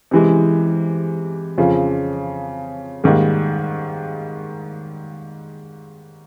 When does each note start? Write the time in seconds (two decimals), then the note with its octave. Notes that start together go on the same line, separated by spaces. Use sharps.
0.11 C3 E3 G#3
1.58 F2 C#3 F3
3.04 G#2 D#3 G3 A#3